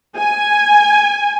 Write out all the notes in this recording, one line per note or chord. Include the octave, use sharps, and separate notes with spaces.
G#5